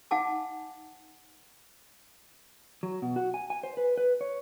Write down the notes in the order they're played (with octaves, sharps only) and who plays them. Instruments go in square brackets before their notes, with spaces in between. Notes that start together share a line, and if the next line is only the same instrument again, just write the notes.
[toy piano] D#4 F5 F#5 G#5 A5 D6
[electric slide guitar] F#3
B2
F#4
G#5
G#5
C5
B4
B4
C#5